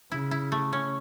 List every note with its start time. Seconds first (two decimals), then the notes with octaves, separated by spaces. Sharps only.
0.12 C#3 E4
0.31 E4
0.52 A3
0.73 C#4